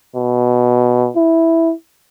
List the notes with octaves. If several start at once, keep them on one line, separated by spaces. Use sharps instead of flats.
B2
E4